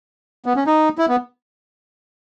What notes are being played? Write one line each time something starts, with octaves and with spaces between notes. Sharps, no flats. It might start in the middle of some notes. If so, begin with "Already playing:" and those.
B3
C#4
D#4
E4
B3